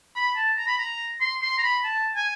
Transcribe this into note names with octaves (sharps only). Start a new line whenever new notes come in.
B5
A5
A#5
B5
A#5
C6
C6
A#5
B5
A5
G#5